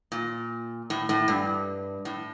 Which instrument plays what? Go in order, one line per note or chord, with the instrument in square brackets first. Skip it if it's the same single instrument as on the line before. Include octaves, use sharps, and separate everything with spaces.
[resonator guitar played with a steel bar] A#2
A2
A2
G2
A2